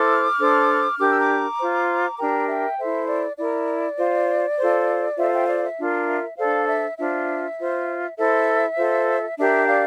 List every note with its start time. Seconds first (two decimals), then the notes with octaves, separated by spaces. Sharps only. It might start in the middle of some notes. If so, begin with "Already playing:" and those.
Already playing: E4 A4 C5 D6 F6
0.38 D4 A4 C5
0.98 D4 G4 A#4 D6
1.10 E6
1.19 A#5 D6
1.58 F4 C5
2.18 D4 G4 A#4 G5 A#5
2.48 E5 G5
2.78 E4 A4 C5 E5
3.08 D5
3.38 E4 A#4 D5
3.98 F4 C5
4.58 F4 A4 C5
5.17 F4 A4 C5 E5
5.32 E5 G5
5.48 D5 F5
5.64 E5
5.78 D4 F4 A#4
6.07 E5
6.37 D4 A4 C5 D5 F5
6.67 E5
6.98 D4 F4 C5 E5
7.58 F4 C5
8.17 E4 A4 C5 E5
8.77 F4 A4 C5
9.37 D4 G4 A#4 E5
9.67 D5 F5